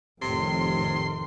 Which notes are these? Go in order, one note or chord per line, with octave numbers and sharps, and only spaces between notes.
F1 F2 A2 C3 D#3 C6